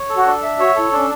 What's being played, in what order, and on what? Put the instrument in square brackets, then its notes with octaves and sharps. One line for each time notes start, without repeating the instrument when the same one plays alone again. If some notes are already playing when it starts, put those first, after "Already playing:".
Already playing: [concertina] C#5
A4
[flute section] F#4
[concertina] D4
E5
[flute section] F#4 [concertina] C#5
[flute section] E4 [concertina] A4
[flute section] C#4 [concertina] D4